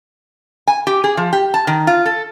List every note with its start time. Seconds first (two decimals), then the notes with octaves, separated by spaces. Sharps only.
0.67 G#5
0.87 G4
1.04 G#4
1.17 F3
1.33 G4
1.54 A5
1.67 D#3
1.87 F4
2.06 A4